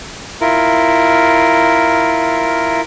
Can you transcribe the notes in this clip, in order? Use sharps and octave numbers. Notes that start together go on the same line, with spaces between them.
E4 F4 A#4